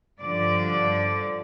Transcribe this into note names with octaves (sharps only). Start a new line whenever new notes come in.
G2 D3 F3 D5